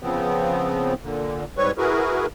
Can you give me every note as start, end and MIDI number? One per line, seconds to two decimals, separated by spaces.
0.03 0.94 49
0.03 0.94 53
0.03 0.94 59
0.03 0.94 60
1.03 1.44 46
1.03 1.44 50
1.57 1.71 44
1.57 1.71 55
1.57 1.71 60
1.57 1.71 71
1.57 1.71 73
1.57 1.71 85
1.78 2.26 64
1.78 2.26 66
1.78 2.26 68
1.78 2.26 70
1.78 2.26 71